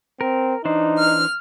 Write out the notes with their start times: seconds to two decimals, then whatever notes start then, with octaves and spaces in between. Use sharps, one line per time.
0.21 C4 A#4
0.65 E3 D4 D#4 C5
0.98 F6